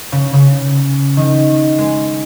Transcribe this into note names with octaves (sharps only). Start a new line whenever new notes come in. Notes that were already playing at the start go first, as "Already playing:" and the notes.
C#3
C#3
D#3
G#3